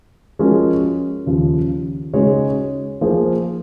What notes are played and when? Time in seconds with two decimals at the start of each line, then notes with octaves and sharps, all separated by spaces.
0.39 F3 G#3 C#4 F#4 A#4
1.26 D#2 C#3 F3
2.13 C#3 G#3 D#4 F#4 C#5
3.01 F3 A#3 F4 G#4 C5